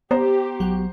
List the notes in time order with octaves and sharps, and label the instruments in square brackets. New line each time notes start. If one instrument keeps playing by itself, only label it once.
[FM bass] B3 [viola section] G4 [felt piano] C5 A#5
[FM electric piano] A#1 F#3 F#5